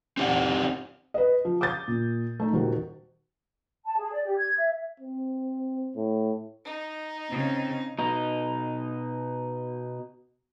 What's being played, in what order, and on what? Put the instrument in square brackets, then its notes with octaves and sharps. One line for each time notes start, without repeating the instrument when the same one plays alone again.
[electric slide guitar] C4 D#4 G4 A4 D5 F#5
[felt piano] B4 D#5
F3
D6 D#6 G6 A6
A#2
A3 D#4
D#1 D#3 F#4
[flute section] A5
G#4
D5
G4
G#6
E5
[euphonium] C4
A2
[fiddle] D#4
[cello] C#3 [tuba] C4
[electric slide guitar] B2 D#4